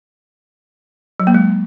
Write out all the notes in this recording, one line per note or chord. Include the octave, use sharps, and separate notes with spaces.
F#3
A#3
G#3